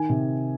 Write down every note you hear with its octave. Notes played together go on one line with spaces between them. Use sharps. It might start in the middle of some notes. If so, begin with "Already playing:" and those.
Already playing: D#3 G#5
C3